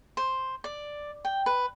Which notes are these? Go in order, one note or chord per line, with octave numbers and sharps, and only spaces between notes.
C5
D5
G5
B4